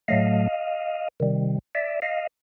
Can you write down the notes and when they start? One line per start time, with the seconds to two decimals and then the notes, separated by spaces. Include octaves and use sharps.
0.08 A2 F#3 A3 D#5 F5
1.20 C3 D#3 G3
1.75 D5 E5
2.02 D#5 F5